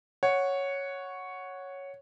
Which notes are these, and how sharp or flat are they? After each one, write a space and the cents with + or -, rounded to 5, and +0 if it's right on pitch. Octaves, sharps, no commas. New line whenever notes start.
C#5 +0 F#5 -5